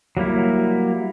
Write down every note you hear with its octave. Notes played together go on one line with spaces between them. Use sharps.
F#3 G3 A#3 E4